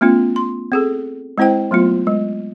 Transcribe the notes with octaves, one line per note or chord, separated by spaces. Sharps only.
A3 B3 C#4 F4
C6
C4 G#4 A4
G#3 C4 E4 C5 G5
F#3 A3 B3 F4
G#3